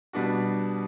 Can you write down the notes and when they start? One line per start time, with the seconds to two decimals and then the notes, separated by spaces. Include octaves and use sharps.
0.13 B2 G3 B3 D4 F#4